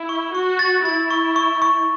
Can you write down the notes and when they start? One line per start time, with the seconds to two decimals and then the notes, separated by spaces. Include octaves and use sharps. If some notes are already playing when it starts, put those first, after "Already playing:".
Already playing: E4
0.09 C#6
0.35 F#4 C#6
0.59 A6
0.85 E4 A6
1.11 C#6
1.36 C#6
1.62 C#6